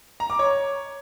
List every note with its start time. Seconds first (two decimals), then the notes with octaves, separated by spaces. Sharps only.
0.20 A#5
0.30 D6
0.39 C#5